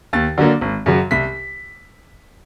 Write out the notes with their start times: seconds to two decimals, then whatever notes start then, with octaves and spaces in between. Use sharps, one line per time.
0.13 D#2 A6
0.38 D3 F#3 A#3 D4
0.61 G#1
0.86 F#2 C#3 F#3
1.11 C2 B6